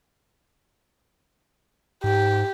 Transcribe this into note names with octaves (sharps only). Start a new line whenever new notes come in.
G#2 G4